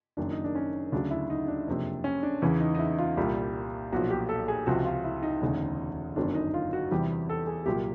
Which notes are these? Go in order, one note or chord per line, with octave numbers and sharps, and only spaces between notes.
F#1 F#2 D#3 D4
D#4
D4
C#4
D2 C#3 F#3 D4
E4
D#4
D4
F#1 F2 C3
C#4
D4
E2 C#3 E3
D#4
D#4
E4
F4
C2 A#2 G3
B1 A#2 F3 F#4
G4
A4
G#4
C#2 C3 F3 F#4
F4
E4
D#4
E1 D2 C#3
G1 F#2 D#3 F#3 D4
D#4
F4
F#4
E2 C3 E3 G3 G4
A4
G#4
C2 A#2 F#3 G4